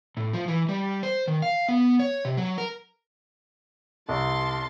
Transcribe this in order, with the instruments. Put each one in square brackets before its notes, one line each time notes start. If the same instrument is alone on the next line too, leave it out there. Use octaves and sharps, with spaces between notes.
[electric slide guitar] A2
F3
E3
G3
C5
D#3
F5
B3
C#5
C3
F#3
A#4
[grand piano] C2 [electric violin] A5 C6